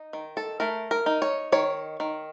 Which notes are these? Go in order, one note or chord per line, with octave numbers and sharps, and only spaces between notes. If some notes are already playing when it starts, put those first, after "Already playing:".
Already playing: D#4
D#3
A4
A3 A#4
A#4
D#4
C#5
D#3 C#5
D#3